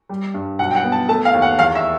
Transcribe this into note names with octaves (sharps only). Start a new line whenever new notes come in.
G3
G2
B1 F#5
G5
F#5
B3
A5
A3 A5
F5
D#2
F#5
E2 F5
E5